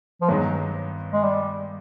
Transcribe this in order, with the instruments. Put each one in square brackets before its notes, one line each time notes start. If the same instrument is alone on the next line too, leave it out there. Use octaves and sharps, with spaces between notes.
[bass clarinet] F3
[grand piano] G2 D#3 G#3 B3 D#4 [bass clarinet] F#3
[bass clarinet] G#3
G3